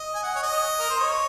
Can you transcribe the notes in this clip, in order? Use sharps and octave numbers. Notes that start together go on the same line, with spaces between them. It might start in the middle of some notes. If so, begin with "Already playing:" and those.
Already playing: D#5
G#5
F#5
C#5
D#5
A#4
C5
C#5